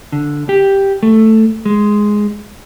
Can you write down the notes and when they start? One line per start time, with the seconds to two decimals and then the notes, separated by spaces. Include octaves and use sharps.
0.12 D3
0.49 G4
1.03 A3
1.65 G#3